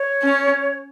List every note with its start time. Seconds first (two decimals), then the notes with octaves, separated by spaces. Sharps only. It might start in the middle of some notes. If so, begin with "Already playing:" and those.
Already playing: C#5
0.23 C#4